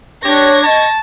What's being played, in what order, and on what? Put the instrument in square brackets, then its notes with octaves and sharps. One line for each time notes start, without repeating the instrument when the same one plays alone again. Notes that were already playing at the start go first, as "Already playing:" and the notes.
[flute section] D4 C#5 [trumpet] G4 [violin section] C#6 G#6 A#6
[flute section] D#5 [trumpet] A5